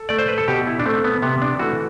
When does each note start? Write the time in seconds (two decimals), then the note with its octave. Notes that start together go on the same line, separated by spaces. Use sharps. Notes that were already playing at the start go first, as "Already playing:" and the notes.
Already playing: A4
0.09 A3 D5
0.18 C5
0.28 B4
0.38 A4
0.48 B2 G4
0.67 E4
0.79 D4
0.86 A3 C4
1.04 B3
1.22 C3 B3
1.42 D4
1.59 E3 A3 F#4